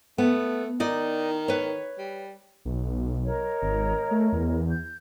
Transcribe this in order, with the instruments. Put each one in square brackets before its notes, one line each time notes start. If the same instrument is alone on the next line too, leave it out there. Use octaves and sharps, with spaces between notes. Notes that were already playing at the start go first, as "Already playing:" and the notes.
[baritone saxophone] A3 [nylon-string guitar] B3
[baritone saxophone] D#3 [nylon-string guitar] D#4 D5 D#5
[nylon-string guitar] B4 C#5
[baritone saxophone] G3
[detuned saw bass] B1
[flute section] A#4 C#5 D#5
[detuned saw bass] G#1
A3
E2
[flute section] G6